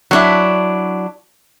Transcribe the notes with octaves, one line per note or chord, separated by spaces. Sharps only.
F#3 D4 E4